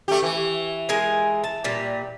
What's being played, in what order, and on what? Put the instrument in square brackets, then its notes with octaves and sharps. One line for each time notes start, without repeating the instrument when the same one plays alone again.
[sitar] A3 G4
E3
[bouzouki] G#3 A#4 G#5
A5
A#2 G3